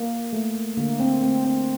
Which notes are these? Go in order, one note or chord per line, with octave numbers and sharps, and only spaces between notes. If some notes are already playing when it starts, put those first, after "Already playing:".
Already playing: A#3
A3
D3 A#3
C4
A3 C4
C4